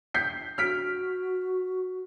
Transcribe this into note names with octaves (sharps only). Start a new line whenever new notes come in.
G6 B6 C7
F#4 F6 B6 D7